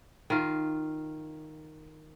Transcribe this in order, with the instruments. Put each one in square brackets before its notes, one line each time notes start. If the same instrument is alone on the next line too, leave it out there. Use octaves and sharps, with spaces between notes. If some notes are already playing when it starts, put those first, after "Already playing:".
[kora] D#3 F4